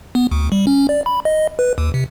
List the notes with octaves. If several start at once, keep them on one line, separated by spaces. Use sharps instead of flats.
B3
D2
G3
C#4
D5
B5
D#5
B4
D#2
C3